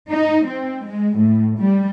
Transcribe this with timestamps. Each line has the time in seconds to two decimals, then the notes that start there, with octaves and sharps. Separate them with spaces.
0.10 D#4
0.47 C4
0.85 G#3
1.18 A2
1.60 G3